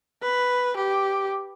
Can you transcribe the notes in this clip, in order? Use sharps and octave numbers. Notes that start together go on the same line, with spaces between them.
B4
G4